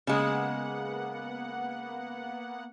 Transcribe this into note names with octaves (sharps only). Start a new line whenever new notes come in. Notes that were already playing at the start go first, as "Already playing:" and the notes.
C#3 G#3 A#3 B3 F#5